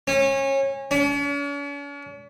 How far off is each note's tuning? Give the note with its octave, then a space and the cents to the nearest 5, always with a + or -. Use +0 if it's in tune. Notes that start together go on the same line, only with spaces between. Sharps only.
C#4 -25
C#4 +45